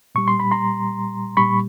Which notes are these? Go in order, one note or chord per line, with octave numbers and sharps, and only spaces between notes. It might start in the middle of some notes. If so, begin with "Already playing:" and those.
A#2 G3 C#6
C6
B5
A#5 C6
A#2 G3 B5 C#6